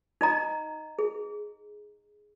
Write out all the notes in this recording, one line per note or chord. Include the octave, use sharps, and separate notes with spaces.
D#4 D#5 A#5
G#4